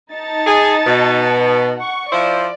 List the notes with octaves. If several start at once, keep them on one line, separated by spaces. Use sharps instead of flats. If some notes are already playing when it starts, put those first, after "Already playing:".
D#4 A5 A6
G#4
B2
F#5 C#6
F3 E4 C5 D5